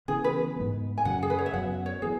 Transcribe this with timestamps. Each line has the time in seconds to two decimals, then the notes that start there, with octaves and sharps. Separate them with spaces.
0.08 C#3 E3 B3 G#4
0.24 B4
0.56 G#2 G#3 B3
0.98 G#5
1.05 F#2 C#3 F#3 F#5
1.23 G#4
1.30 B4
1.38 C#5
1.46 E5
1.53 F#2 F#3 B3 F#5
1.86 C#5
2.02 E3 B3 G#4